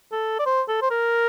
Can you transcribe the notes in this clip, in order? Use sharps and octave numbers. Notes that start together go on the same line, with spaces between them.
A4
D5
C5
A4
C5
A#4